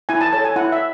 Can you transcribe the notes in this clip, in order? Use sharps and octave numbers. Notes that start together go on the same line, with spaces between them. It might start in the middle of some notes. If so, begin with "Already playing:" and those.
E4 G#5
A5
A4 C#5 A5
G#5
E4 F#5
E5